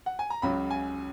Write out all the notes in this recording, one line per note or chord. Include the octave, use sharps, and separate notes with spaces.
F#5
G#5
A#5
C#2 C#3 F#3 B5
G#5